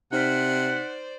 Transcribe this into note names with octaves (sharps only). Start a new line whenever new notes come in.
C3 D#4 C5 D5 F#5 F6 B6